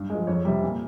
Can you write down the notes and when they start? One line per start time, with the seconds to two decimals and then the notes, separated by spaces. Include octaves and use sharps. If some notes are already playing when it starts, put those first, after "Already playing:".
Already playing: G2
0.10 F3 G#3
0.27 F2 C#5
0.45 C3 G3
0.62 A#2